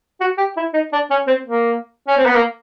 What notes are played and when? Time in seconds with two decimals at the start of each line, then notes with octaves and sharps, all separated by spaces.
0.20 F#4
0.38 G4
0.56 E4
0.73 D#4
0.92 D4
1.10 C#4
1.27 C4
1.45 A#3
2.08 C#4
2.17 C4
2.26 B3
2.35 A#3